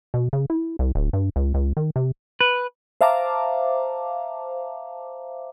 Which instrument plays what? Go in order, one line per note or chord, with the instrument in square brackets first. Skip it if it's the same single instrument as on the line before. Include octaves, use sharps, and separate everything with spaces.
[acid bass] B2
C#3
E4
C2
D1
G2
C#2
C#2
D#3
C3
[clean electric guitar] B4
[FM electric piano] C5 E5 F5 A5 A#5 D6